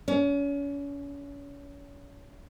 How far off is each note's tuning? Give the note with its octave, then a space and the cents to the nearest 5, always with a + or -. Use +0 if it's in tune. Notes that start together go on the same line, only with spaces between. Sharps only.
C#4 +35